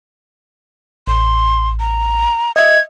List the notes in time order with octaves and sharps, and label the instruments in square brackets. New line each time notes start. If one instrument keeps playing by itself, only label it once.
[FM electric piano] A1 [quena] C6
[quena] A#5
[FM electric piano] D#5 E5 [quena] G#6